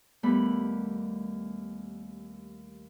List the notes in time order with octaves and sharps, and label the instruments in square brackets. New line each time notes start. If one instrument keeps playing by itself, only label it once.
[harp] D#2 G3 A3 B3 B5